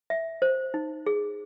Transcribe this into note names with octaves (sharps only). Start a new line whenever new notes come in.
E5
C5
D#4
G#4